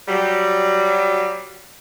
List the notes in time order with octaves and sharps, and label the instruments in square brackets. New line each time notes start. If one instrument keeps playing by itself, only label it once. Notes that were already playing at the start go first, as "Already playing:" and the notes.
[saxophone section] F#3 G3